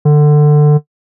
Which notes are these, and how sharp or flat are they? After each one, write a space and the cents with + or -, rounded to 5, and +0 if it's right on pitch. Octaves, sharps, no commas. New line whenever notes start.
D3 +20